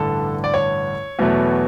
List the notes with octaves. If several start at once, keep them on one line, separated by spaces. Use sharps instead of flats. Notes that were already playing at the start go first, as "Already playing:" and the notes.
Already playing: A1 G2 D3 A4
D5
C#5
E2 B2 F#3 A3